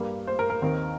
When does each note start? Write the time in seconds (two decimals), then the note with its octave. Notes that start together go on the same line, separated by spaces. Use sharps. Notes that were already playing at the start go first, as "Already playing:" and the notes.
Already playing: G2 G3 A#3
0.27 C5
0.39 A#4
0.50 A#4
0.62 D#2 D#3 C4